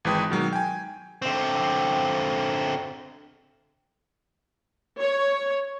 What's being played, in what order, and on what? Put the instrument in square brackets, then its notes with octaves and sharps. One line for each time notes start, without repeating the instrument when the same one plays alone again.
[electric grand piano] G#1 E3 G#3 B4 G5 D#6
B2 D#3 F#3 G#3
G5 G#5
[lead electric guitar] D3 C4
[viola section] C#5